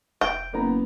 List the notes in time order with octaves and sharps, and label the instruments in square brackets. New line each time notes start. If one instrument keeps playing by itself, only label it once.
[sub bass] F1 [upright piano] E5 [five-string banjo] G5
[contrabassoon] F#1 [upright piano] A#3 B3 A#5